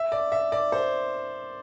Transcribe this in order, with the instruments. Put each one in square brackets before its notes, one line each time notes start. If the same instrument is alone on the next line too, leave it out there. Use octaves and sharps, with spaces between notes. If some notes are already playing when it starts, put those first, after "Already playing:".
Already playing: [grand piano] E5
D5
E5
D5
C5